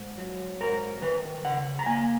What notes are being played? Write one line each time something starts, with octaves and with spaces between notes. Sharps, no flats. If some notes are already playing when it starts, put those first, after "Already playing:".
Already playing: G#2
F#3
G#2 A#4
D#3 B4
C#3 F#5
A#5
A#3 G#5